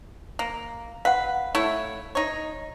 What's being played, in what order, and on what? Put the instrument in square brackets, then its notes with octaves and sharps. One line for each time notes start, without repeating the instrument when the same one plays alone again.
[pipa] A#3
[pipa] B4 [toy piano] F5 F#5
[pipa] A3 E4 C#5
D#4 C#5